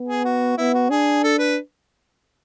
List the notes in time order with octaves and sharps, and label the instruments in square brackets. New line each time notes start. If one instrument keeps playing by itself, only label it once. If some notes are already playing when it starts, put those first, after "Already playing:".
Already playing: [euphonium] B3
[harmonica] G#4
F#4
[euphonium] B3 [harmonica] E4
[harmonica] F#4
[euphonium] D4 [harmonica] G#4
[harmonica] A4
B4